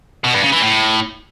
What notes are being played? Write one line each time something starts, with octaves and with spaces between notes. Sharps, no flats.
B2
G2
C#3
E3
A2